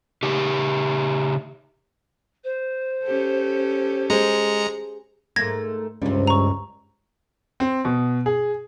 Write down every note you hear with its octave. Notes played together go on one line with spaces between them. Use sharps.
C#3 D#4 G4
C5
C#4 G4 A4
G#3 G#4 C5 A#5 C#7
G#2 A3 A#3 G#6 A#6
C#2 G2 C3 G3
A#5 C#6
C4
B2
G#4